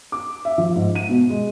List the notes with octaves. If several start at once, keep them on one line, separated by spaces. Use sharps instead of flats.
D6
E5
F3
G#2
D#7
B2
G#3